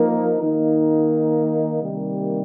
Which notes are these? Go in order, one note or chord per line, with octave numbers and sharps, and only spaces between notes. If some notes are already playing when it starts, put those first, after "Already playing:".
Already playing: F3 A#3 D#4 A#4
D#3 A#3 D#4
C3 D#3 G3 A#3